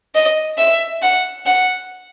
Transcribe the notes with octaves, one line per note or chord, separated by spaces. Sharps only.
D#5
E5
F#5
F#5